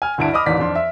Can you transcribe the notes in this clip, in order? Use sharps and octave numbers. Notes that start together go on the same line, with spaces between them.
G#5 F6
D2 G2 D4 E4 A5 D7
D#5 B5 D6 D#6 F6
A1 D#2 D5 B6
F2 D4 C6
E5